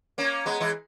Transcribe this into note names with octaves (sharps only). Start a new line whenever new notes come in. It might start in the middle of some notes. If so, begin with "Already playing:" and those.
A#3 C#4
G#3 B3
E3 G#3